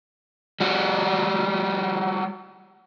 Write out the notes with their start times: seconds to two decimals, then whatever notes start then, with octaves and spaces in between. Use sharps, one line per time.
0.60 G3 F#4